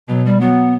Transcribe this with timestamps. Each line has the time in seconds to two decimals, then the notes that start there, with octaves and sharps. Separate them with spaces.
0.08 B2 F#3
0.25 G3
0.40 F#3 B3